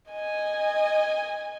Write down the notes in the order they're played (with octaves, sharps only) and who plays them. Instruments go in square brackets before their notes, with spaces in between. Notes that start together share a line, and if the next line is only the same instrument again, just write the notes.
[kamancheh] D#5 G#5